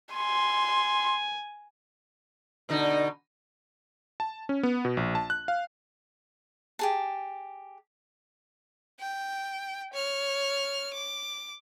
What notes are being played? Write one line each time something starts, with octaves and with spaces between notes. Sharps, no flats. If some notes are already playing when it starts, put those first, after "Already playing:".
G#5 C6
B2 D3 D#4
A5
C#4
B3
B2
A#1
A5
F#6
F5
G4 G#4 A5
G5
C#5 F6
D6